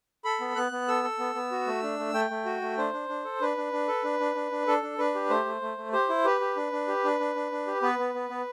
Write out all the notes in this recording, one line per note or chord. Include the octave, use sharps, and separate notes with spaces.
A4 B5
B3
B3 F#6
B3
A4 E6
A4
B3
B3
F#4
A3
D4
A3
A3 G5
A3
F#4
A3
D4 C5
D4
D4
A4
D4 B4
D4
D4
A4
D4
D4
D4
D4
D4 A4
D4
D4 B4
G4
A3 C5
A3
A3
A3
G4 C5
E4
G4 B4
G4
D4
D4
G4
D4
D4
D4
D4
G4
B3 B4
B3
B3
B3